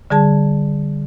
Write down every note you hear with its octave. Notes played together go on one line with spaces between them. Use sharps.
D3 G3 G#4 A5